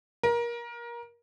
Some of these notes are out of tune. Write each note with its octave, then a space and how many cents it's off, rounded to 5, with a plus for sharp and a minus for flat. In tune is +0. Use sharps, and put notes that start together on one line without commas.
A#4 +25